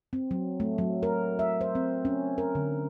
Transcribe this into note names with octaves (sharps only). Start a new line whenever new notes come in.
C4
F#3
A3
F#3
A#4
E5
C5
C4
C#4
A#4
D3